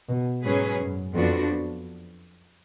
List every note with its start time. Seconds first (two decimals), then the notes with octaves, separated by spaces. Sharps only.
0.09 B2
0.44 G#2 F#3 C#4 G#4 B4
0.79 F#2
1.14 F2 F3 B3 D4 F#4